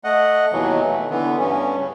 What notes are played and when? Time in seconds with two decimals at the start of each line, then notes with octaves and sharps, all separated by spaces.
0.04 A3 D#5 F#5
0.52 D#2 B2 E3 F#3
0.84 A3
1.10 D3 E3 B3
1.39 G2 C#4
1.78 C#3